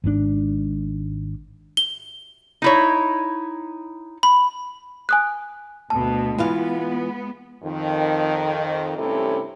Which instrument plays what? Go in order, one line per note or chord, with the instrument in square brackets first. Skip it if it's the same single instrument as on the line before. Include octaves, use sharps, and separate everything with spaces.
[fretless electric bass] G#1 G#2 D#3 D4
[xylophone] G7
[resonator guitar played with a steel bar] D#4 E4 C#5
[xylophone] B5
G#5 D#6 F#6
[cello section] D2 B2 [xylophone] A5
[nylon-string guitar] E3 F4 F5 [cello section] G#3 B3
[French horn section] F2 D#3
G2 C3 A3 C#4 E4 A4